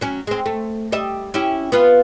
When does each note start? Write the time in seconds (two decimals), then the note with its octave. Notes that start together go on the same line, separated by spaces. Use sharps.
0.01 F#3 C#4
0.27 G#3 C4
0.46 A3
0.92 G3 D#5 E5
1.34 C#4 E4 G4
1.72 B3 F4 B4